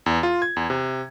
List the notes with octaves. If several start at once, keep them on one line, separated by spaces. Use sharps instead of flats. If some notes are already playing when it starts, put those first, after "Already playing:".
E2
F4
G#6
E2
C3